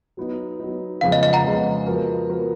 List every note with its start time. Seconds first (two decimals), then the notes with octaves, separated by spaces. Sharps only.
0.17 F#3 B3 D#4
0.60 F#3 B3 D#4
1.01 F2 C#3 F3 G#3 B3 F5
1.12 D#5
1.23 D#5
1.33 F#5 A#5
1.44 F2 C#3 F3 G#3 B3
1.86 F3 B3 F#4 A#4
2.29 F3 B3 F#4 A#4